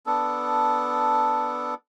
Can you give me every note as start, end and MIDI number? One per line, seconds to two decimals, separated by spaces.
0.06 1.74 59
0.06 1.74 62
0.06 1.74 69